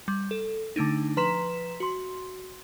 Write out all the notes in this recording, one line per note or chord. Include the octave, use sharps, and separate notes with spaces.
G3
A4
D3 A3 D4 D#4
F3 B4 A#5 C6 B6 E7
F#4 C6